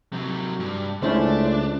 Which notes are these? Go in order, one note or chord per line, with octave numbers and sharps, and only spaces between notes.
C3 F#3
G2
C#2 A3 C#4 D4 E4 C5